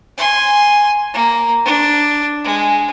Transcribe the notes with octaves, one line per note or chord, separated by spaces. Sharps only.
G#5 C6
A#3
D4
G#3